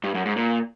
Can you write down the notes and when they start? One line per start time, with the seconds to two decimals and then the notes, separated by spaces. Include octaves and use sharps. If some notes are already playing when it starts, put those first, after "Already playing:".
0.04 G2
0.15 F#2
0.25 G#2
0.36 A#2